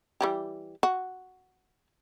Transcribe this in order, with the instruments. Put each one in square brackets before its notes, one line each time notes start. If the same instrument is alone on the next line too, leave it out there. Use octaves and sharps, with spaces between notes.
[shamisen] E3 G3 G4
F#4